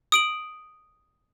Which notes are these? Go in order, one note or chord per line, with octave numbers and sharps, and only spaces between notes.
D#6 D7 F#7